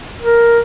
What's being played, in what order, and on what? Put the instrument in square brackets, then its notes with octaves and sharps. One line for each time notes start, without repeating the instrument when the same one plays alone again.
[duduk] A#4